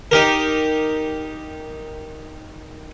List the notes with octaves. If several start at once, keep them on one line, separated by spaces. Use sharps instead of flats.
D#4 G4 A#4